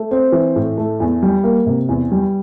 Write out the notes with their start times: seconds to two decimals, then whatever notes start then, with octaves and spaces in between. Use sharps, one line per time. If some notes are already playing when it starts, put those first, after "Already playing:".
Already playing: A3
0.11 C4
0.32 E3
0.56 A2
0.78 A3
1.00 E2
1.23 G3
1.44 A#3
1.66 C3
1.89 E2
2.12 G3